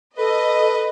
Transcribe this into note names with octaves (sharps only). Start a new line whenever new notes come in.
A4 B4 D#5